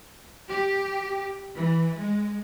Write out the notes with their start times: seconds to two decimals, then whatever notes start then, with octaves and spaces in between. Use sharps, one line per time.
0.49 G4
1.55 E3
1.98 G#3